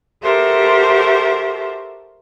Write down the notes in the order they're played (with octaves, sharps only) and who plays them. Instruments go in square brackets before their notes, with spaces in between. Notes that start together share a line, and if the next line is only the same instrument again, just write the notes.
[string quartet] F#4 G4 A4 A#4 C5 E5